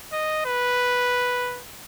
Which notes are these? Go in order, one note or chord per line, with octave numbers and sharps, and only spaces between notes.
D#5
B4